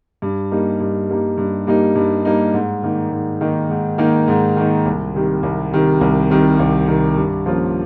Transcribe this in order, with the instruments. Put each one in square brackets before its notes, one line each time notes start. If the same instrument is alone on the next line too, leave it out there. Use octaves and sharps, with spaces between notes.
[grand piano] G2
G3 A#3 D#4
G2
G3 A#3 D#4
G2
G3 A#3 D#4
G2
G3 A#3 D#4
G#2
D#3 A#3 D#4
G#2
D#3 A#3 D#4
G#2
D#3 A#3 D#4
G#2
D#3 A#3 D#4
C2
C3 D#3 G3
C2
C3 D#3 G3
C2
C3 D#3 G3
C2
C3 D#3 G3
G2
F3 A#3 C#4 F4